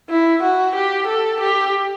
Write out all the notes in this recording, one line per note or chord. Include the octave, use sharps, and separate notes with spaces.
E4
F#4
G4
A4
G4